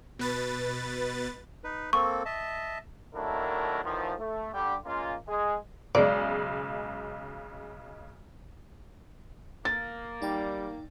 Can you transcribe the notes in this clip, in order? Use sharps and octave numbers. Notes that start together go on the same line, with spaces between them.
B2 B4 A6
D#4 B4
A#3 C4 A4 C#6
D#5 E5 A5
D#2 F#3 A3 D4 E4 A#4
E2 A2 D#3 F3
A3
D3 G3 G4
G#3 A#3 C#4 F4
G#3 G#4
B1 C#3 G#3 D5
A#3 A6
G3 D#4 D5 G5